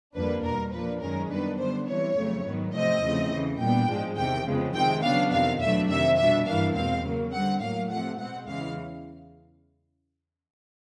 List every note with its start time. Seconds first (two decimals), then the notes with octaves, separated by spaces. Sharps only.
0.15 F2 D3 G3 A#3 D4 B4
0.44 E2 B2 G3 A#4
0.73 A#2 F3 A#3 D4 B4
1.01 F#2 D#3 G#3 C#4 A#4
1.30 F#2 D#3 G3 B3 D4 B4
1.59 D3 G3 B3 D4 C5
1.87 C3 E3 G3 C#5
2.16 F2 C#3 F#3 A3
2.44 G#2 D#3 F#3 B3
2.74 C3 F3 A3 C4 D#5
3.02 E2 C#3 F3 A3 C4
3.31 E2 C#3 E3
3.59 A#2 G3 B3 D4 G5
3.88 G#2 F3 G#3
4.17 E2 C3 D#3 G5
4.46 F2 C#3 F3 G#3 B3
4.74 C3 D#3 G#3 C4 G5
5.03 C#3 F#3 B3 D4 F5
5.32 F2 C3 D#3 F5
5.60 E2 B2 F#3 A3 D4 E5
5.89 F2 C3 D#3 E5
6.18 B2 G3 B3 D4 E5
6.46 G2 E3 G3 A#3 D4 F5
6.75 E2 B2 G#3 C4 F5
7.03 C#3 F#3 A#3
7.33 D3 G3 C4 F#5
7.61 A2 F#3 A#3 F5
7.90 C3 F3 A3 F#5
8.18 B2 G#3 C4 F#5
8.47 E2 C#3 E3 G#3 F5